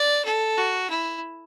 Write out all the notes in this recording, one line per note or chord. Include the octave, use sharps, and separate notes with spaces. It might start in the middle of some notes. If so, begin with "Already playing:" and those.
Already playing: D5
A4
F#4
E4